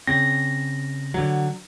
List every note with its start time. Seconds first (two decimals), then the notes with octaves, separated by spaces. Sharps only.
0.07 C#3 C4 A#6
1.14 D3 F#3